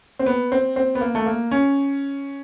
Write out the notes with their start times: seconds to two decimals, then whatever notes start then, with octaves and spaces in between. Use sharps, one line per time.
0.19 C4
0.26 B3
0.52 C4
0.76 C4
0.95 B3
1.01 A#3
1.15 A3
1.26 A#3
1.51 C#4